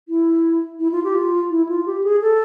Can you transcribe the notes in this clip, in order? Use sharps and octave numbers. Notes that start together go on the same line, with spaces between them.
E4
E4
F4
G4
F4
E4
F4
G4
G#4
A4